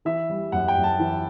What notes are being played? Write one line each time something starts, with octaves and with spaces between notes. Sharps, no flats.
E3 E5
G3
F#2 F#5
G5
F#2
A5
E3